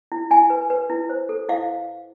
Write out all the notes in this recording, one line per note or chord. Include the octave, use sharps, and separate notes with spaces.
E4
E4 G#5
B4
B4
E4
C5
A4
E4 F5